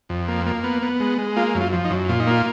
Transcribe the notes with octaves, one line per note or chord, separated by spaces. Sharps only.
F2
A#3
A#3
B3
B3
G#3
G#3
A#3 F4
F#2
F4
F3
D#4
F#2
A#2 F4
D#4
A#3 F4